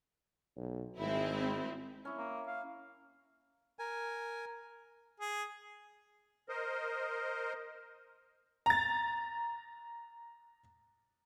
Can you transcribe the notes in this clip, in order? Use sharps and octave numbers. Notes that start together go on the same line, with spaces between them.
B1
G#1 G#3 C4 E4
C#4 E4
A#3
F5
A#4 G#5
G#4
A#4 C5 D#5
A#5 A6